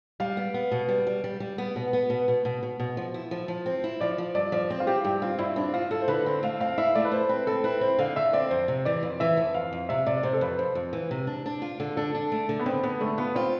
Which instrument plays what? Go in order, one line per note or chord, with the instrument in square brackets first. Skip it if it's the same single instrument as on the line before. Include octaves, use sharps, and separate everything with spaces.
[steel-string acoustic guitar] G3 [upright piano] F5
[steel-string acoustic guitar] B3
B3
B2
G3
G3
G3
G3
B3
B2
B3
B2
B2
B2
B2
B2
F3
E4
F3
F3
[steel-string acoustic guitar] C4 [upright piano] C5
[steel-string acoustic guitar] E4
[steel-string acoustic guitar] F3 [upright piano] D5
[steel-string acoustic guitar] F3
[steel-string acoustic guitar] G2 [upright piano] D5
[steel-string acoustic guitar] F3 [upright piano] D5
[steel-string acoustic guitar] C4 [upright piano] C5
[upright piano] F4
[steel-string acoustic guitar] E4 [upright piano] G4
[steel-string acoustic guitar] G2 [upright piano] G4
[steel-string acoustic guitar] C4 [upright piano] F4
[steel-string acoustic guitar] G2 [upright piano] E4
[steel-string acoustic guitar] C4 [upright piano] D4
[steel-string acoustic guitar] E4 [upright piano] F4
[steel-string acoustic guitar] E4 [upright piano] A4
[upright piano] C5
[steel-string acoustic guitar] D3 [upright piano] B4
[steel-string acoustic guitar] C4 [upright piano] C5
[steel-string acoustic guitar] A3 [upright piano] F5
[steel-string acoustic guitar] C4 [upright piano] F5
[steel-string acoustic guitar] E4 [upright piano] E5
[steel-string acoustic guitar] A3 [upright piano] D5
[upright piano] B4
[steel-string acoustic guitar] E4 [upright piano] C5
[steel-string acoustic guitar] C4 [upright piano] B4
[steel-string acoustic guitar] C4 [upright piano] A4
[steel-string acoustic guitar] E4 [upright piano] B4
[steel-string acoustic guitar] C4 [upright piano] C5
[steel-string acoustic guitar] D3 [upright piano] F5
[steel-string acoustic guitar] D3 [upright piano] E5
[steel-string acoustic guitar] C4 [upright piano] D5
[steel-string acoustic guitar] F2 [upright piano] C5
[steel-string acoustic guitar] C3
[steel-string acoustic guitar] E3 [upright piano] D5
[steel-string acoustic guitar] F2
[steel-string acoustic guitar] E3 [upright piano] E5
[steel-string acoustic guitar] F2
[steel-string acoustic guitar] F2 [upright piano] F5
[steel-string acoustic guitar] F2
[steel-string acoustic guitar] C3 [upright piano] E5
[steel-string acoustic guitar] C3 [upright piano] D5
[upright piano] D5
[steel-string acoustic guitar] C3 [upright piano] C5
[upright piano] A4
[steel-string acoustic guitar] F2 [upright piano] B4
[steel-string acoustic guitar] F2 [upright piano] C5
[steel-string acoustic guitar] F2
E3
C3
D4
D4
F4
D3
[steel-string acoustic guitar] D4 [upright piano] A4
[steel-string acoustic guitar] D4
A3
D3
[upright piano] B3
[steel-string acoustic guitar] D3 [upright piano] C4
[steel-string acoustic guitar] D3 [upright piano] B3
[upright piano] A3 [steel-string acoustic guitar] D4
[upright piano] B3 [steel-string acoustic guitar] F4
[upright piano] C4 [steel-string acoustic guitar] F4